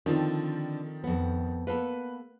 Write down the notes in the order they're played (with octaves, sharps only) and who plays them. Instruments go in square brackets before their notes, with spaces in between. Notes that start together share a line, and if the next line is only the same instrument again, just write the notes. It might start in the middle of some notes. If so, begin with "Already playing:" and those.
[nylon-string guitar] D3 [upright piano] D#3 F3 C4
[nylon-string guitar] F2 B3
[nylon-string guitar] A#3 B3 A4 [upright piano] B4